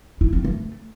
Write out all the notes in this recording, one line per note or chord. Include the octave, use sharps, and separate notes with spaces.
E4
C4
A3